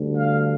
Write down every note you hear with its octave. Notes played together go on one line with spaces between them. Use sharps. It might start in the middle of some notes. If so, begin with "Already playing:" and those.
Already playing: D2 D3 G3
F5